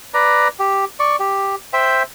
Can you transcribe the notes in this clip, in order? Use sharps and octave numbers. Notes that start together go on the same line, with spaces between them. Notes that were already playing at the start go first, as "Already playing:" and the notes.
B4 D5 A#5
G4
D5 C#6
G4
C5 E5 G5